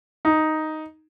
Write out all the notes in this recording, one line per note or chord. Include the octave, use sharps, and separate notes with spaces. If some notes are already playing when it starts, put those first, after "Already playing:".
D#4